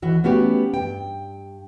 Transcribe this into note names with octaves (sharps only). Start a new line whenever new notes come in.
D#2 E3 F#4
A3 B3 C#4 F#4 G4
G2 G5